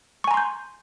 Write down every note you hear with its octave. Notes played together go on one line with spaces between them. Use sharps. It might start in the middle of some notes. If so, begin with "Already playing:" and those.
G#5 A#5 C6 C#6 G6